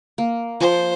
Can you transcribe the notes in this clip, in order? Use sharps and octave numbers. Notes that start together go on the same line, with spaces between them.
A#3
F3 C5